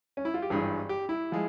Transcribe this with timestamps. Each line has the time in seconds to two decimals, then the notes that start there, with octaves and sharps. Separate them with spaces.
0.17 C#4
0.25 E4
0.34 F4
0.42 G4
0.50 G#1 G2 E3 G#4
0.89 G4
1.09 E4
1.32 F3 G#3